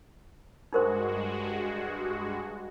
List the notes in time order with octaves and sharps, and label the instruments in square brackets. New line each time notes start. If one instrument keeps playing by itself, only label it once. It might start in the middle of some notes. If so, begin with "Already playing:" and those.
[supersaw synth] G2 G#3 F#4 [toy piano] D#4 A#4 C5